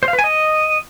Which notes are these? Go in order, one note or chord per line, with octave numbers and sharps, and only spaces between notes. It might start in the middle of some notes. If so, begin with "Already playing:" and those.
C5
F5
B4
G#5
D#5